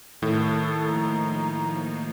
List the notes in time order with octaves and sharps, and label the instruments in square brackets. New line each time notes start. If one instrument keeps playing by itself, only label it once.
[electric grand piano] A2 [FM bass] D#3 [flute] A4 [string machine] A#4
[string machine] F3 A#3 D#4 [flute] A#5